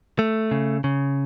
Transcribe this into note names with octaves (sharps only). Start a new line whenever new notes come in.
A3
C#3
C#3